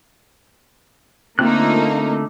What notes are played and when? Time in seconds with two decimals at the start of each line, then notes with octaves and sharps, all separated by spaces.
1.39 D3 A3 A#3 C4 D#4 F4 F#6